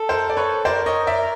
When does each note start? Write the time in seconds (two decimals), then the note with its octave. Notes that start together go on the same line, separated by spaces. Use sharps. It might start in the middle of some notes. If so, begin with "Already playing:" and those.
Already playing: A4
0.09 A#4 C5
0.29 D5
0.37 B4 C#5
0.65 A#4 C5 D5
0.86 C#5 D#5
1.07 D5 E5